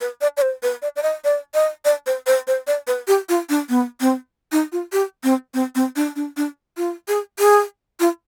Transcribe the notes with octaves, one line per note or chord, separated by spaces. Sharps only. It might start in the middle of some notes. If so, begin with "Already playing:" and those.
B4
D5
D5
C5
B4
D5
D5
D#5
D5
D#5
D5
C5
C5
C5
D5
B4
G4
F4
D4
B3
C4
D#4
F4
G4
C4
C4
C4
D4
D4
D4
F4
G#4
G#4
F4